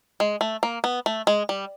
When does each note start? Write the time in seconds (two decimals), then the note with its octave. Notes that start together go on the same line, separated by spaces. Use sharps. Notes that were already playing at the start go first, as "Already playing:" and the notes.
0.20 G#3
0.41 A3
0.63 A#3
0.84 B3
1.06 A3
1.27 G#3
1.49 G3